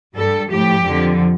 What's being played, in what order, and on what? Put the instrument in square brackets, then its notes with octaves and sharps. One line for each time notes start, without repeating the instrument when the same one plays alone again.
[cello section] G2 G3 A4
A2 F3 G4
F2 D3 F3